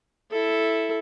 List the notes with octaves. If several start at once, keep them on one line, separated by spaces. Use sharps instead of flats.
E4 A4